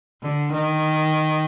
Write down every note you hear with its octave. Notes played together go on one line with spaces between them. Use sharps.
D3
D#3